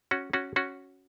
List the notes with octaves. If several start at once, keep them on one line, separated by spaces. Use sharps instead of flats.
C#4 F#4
C#4 F#4
C#4 F#4